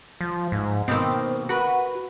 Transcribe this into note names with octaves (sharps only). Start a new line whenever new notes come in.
F3
G#2
B2 D#3 A#3 C4
F#4 A#4 B4